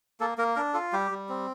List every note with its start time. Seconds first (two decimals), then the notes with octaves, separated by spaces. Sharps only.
0.20 A#3 A4
0.38 A#3 A#4
0.56 D4 A#4
0.74 F4 A4
0.93 G3 G4
1.11 G3
1.29 C4